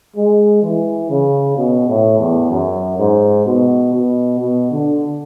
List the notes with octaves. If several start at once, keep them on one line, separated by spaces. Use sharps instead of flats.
G#3
E3
C#3
B2
A2
E2
F#2
G#2
B2
B2
B2
D3